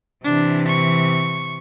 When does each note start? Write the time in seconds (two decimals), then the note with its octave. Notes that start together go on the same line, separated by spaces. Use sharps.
0.24 C3 E3 D4
0.67 C#6